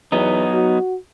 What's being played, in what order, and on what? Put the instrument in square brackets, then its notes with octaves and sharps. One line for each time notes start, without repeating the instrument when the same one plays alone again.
[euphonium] E2 [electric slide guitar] F#3 B3 D#4
[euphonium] F#4